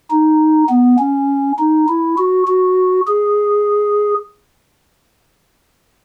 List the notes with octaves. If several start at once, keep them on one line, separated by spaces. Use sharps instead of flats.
D#4
B3
C#4
D#4
E4
F#4
F#4
G#4